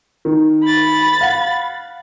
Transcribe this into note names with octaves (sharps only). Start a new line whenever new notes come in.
D#3
B5 A6
F5 F#5